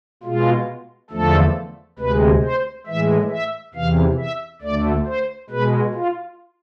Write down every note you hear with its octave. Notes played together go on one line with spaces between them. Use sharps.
B2 G#3 F4
E2 D3 F3 A3 A4
D2 C3 G#3 B4
C5
A2 E3 G#3 E5
E5
E2 C3 E3 F5
E5
D2 D3 A3 D5
C5
B2 G#3 B4
F4